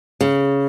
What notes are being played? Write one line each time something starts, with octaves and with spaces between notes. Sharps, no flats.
C#3